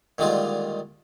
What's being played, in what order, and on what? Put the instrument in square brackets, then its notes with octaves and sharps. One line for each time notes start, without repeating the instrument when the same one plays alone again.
[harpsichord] A#2 D3 D#3 G3 G#3 F4